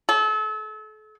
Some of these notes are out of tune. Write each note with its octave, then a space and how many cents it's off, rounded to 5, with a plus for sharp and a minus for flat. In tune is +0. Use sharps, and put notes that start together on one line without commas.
A4 -35